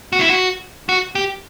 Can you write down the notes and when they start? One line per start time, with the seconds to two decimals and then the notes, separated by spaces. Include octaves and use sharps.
0.13 F#4
0.20 E4
0.29 F#4
0.89 F#4
1.15 G4